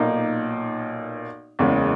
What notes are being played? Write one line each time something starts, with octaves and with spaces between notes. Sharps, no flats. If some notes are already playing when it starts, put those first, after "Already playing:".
Already playing: B1 A#2 A#3 D#4
F#1 E2 C#3 G#3